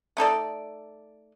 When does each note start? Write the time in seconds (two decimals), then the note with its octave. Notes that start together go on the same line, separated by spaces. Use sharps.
0.17 A3 D#4 A4 D5